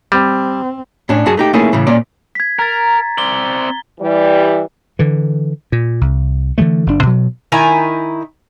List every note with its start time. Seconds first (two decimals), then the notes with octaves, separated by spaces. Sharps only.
0.12 G3 C4
1.09 A2 C#4 D4
1.26 F#2 F#4 G#4 A5
1.37 A3 D#4 G4
1.53 A3 A#3 C#4 D#4 E4 G#4
1.73 A2 C#3 E3
1.87 A#2 C#4 D5
2.35 G#6 B6
2.59 A#4 A#5 A6
3.18 C4 D5 G7
4.00 E3 G3
4.99 D3 E3
5.72 A#2
6.01 C2
6.58 D3 E3 G#3 A3
6.86 F#1 A2 D4
7.03 B2 F#3
7.52 D#3 E4 G#5 A#5